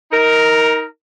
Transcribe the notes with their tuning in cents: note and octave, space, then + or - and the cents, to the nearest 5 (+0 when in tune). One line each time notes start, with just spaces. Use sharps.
D#4 +25 A#4 +0